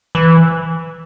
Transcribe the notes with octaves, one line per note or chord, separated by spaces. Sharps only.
E3